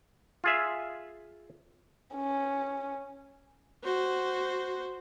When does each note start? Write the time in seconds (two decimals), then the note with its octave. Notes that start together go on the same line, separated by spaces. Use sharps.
0.44 F4 G#4 E5
2.15 C#4
3.84 F#4 C5